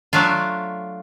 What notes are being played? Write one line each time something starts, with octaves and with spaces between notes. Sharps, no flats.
F#3 A3 D4 F4